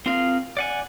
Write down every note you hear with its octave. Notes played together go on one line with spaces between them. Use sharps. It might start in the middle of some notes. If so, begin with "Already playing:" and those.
C4 F4 G#4 A#4 F5
D5 F#5 G#5